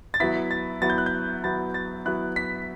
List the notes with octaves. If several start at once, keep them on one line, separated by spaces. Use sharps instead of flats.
A6
F#3 B3 E4 B6
A6
F#3 B3 E4 A6
G6
F#6
G6
F#3 B3 E4 A6
A6
F#3 B3 E4 F#6
B6